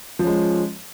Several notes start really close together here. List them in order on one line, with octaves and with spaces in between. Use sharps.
F3 C#4 G#3